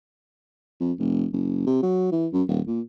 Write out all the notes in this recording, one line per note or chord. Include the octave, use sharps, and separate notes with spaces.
F2
F1
F#1
C3
F#3
E3
F#2
D#1
A#2